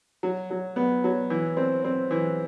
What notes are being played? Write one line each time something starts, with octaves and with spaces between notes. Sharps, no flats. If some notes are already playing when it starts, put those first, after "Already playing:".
F#3
F#3
B3
F#3
E3
C4
C4
E3